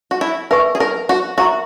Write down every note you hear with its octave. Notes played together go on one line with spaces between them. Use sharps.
F#4
E4
A#4 B4 E5 G#5 C#6
G#4
A#4
F#4
F#4 A#4 E5 A#5 C#6